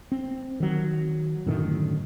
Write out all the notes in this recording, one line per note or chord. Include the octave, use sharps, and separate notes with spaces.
C4
D#3 F#3
F#2 A2 D3 D#3